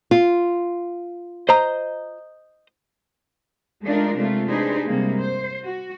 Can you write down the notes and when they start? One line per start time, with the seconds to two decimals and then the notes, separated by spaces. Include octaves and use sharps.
0.11 F4
1.49 C5 D#5 A#5
3.84 G#3 A3 D4 D#4 F4 A#4
4.16 C3 G#3 A3 D4 F4
4.48 D4 D#4 G4 G#4 B4 C5
4.86 C3 G3 G#3 A#3
5.19 C5
5.64 F#4